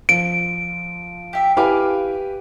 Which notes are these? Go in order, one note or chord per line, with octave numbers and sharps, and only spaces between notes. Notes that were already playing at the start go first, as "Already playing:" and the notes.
F3 D7
G4 E5
E4 G4 B4 F5 G#5 D6